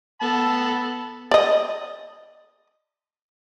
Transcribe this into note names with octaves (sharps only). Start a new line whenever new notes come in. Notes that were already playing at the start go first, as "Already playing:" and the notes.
B3 A4 A5 B5
D5 D#5